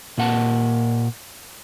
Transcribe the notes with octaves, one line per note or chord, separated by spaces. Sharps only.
A#2 A#3 F#5 A5